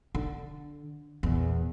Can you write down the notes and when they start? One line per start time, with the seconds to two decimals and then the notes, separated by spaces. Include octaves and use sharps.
0.15 D3
1.23 E2 A#2